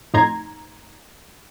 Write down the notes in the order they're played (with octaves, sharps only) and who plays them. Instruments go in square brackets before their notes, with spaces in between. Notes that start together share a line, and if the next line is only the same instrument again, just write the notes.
[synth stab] F2 A2 D#4 A#5 C6 G#6